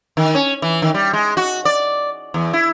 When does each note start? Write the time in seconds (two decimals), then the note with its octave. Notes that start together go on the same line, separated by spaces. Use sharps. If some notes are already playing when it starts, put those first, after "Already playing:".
0.17 D#3
0.35 C#4
0.62 E3
0.82 D#3
0.94 G3
1.13 G#3
1.37 F#4
1.65 D5
2.34 E2
2.53 E4